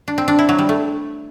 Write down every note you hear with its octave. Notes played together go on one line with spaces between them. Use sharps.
D4
C4
D4
E4
F#3
G3
A3